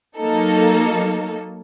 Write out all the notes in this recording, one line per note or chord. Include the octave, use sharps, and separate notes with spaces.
F#3 A#3 D#4 A4